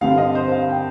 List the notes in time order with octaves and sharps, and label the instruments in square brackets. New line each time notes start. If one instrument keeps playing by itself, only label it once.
[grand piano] G2 D3 G3 C4 [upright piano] F5
[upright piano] D#5
C5
F5
G5